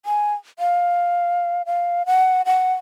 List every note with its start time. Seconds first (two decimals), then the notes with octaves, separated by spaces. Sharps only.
0.06 G#5
0.59 F5
1.66 F5
2.06 F#5
2.46 F#5